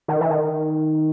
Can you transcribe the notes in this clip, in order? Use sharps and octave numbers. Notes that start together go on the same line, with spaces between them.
D#3
E3
D#3